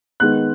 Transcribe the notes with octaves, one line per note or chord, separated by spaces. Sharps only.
D#3 G#3 B3 F#6